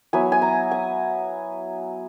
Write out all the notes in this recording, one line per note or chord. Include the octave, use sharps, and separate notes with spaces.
F#3 B3 E4 G#5
G#5
A#5
G#5